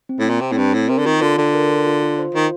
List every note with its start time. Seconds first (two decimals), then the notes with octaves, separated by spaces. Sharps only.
0.09 C4
0.19 A2
0.25 A#2 C4
0.41 C3 C4
0.52 A2
0.58 G2 C4
0.74 A2 C4
0.89 C3 A#4
0.98 D3
1.06 D#3 F4
1.22 D3 F4
1.38 D3 F4
1.54 A#4
1.71 F4
1.87 F4
2.03 F4
2.19 C5
2.35 D#3 F4